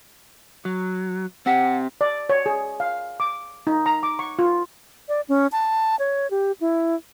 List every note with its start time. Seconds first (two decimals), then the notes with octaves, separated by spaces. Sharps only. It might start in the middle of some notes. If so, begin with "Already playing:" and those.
0.65 F#3
1.46 C4 G4 F#5
2.01 D5
2.30 C#5
2.46 G#4
2.80 F5
3.20 D6
3.67 D#4
3.86 A#5
4.03 D6
4.19 C#6
4.39 F4
5.09 D5
5.29 C#4
5.52 A5
5.99 C#5
6.31 G4
6.61 E4